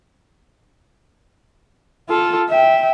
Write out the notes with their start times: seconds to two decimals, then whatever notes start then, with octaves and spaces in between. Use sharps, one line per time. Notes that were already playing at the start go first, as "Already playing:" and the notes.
2.09 F4 A4
2.49 E5 G5